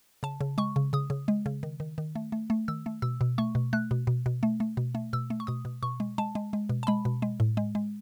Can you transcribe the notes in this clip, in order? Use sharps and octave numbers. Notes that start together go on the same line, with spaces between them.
C#3 A5
C#3
G#3 C#6
C#3
C#3 D#6
C#3
G#3
C#3
D#3
D#3
D#3
A3
A3
A3
D#3 E6
A3
B2 E6
B2
A3 C#6
B2
A3 F#6
B2
B2
B2
A3
A3
B2
A3
B2 E6
A3
C#6
B2 D#6
B2
B2 C#6
G#3
G#3 A5
G#3
G#3
B2
A5
G#3 B5
B2
G#3
A2
G#3
G#3